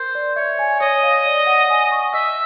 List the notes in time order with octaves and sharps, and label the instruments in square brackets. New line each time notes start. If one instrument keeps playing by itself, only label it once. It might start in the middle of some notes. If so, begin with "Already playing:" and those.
Already playing: [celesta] A#4 [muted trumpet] C5
[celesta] D5
[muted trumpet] C#5 [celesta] E5
[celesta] G#5
[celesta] C#5 [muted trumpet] D#5
[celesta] F5
D5
F#5
G#5
C#6
[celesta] D#5 [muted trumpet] E5